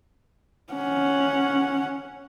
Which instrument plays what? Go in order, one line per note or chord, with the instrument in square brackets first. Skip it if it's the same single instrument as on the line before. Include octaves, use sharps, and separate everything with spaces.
[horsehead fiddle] C#4 F#5